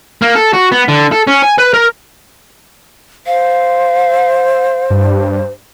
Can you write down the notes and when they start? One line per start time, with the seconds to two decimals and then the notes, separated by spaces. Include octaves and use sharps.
0.22 A#3
0.35 A4
0.53 F#4
0.72 B3
0.88 D3
1.12 A4
1.27 C#4
1.43 G#5
1.58 B4
1.74 A#4
3.26 C5 F5
4.90 G2